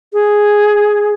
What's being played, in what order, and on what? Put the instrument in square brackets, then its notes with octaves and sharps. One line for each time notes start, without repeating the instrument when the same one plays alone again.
[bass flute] G#4